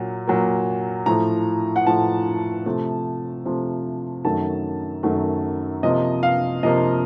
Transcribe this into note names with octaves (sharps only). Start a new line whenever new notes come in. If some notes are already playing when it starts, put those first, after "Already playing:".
Already playing: A#2 F#3 A#3
A#2 F#3 A#3
A2 F3 A3 A#5
F#5
A2 F3 A3 A5
C3 F3 A3
C3 F3 A3
F#2 D#3 F#3 A3 A5
F#2 D#3 F#3 A3
C3 F3 A#3 D#5
F5
C3 F3 A#3 D#5